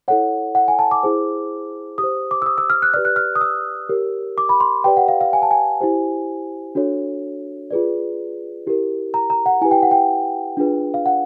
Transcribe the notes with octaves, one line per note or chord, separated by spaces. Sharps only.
E4 A4 C#5 F#5
F#5
G#5
A5
D6
E4 G#4 C5
G4 D#6
C5
D6
E6
D#6
E6
F6
F#6
G4 B4 D5 F6
F#6
F6
D#6
E6
G4 A#4 C#5
D6
B5
C6
G4 B4 D5 G5
F#5
F5
F5
G#5
A5
G#5
E4 G4 C5
D4 F#4 A4 C#5
F4 G#4 B4 D5
E4 G4 A#4
A#5
A#5
F#5
E4 G4 B4 G#5
G5
F#5
G5
D4 F4 G#4 B4
F5
F#5